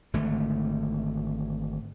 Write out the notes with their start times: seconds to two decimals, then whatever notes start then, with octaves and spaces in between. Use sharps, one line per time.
0.14 G#1 D3 A3